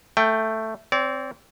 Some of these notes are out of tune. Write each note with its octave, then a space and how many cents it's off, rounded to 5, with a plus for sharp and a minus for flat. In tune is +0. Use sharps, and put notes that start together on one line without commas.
A3 +5 G5 +0
C4 +0 D5 -40